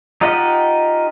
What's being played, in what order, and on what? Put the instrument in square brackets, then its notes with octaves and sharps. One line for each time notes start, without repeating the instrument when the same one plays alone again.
[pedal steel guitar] D#4 F4 G4 D#5 F#5